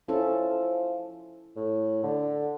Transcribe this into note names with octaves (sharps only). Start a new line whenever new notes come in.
F3 C#4 E4 A4
A2
D3